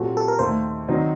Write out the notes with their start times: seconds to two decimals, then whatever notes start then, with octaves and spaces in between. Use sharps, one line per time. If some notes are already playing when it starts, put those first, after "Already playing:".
Already playing: A#2 F#3 C4 F#4 G4 A4
0.17 A4
0.28 A#4
0.39 D#2 D#3 A3 C5
0.88 D#3 F#3 C4 D#4